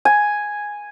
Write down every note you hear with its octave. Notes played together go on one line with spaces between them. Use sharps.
G#5